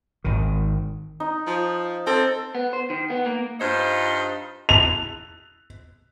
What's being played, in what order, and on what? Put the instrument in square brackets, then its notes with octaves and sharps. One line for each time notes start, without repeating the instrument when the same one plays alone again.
[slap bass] G#1 D#3
[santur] D#4
[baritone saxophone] F3
[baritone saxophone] C4 [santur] A4
[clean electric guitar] B3
C5
D#3
B3
A#3
[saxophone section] G2 D#4 F4 C5
[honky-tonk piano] F7